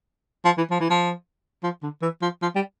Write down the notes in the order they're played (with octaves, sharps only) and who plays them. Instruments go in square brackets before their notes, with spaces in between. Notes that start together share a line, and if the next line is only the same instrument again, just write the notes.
[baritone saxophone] F3
E3
F3
E3
F3
F3
D3
E3
F3
F3
G3